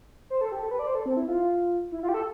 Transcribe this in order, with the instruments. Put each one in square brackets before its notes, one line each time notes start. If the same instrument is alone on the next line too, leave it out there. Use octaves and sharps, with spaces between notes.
[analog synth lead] C5
A4
G4
A4
B4
D5
C5
A4
C4
E4
F4
E4
F4
G4
A4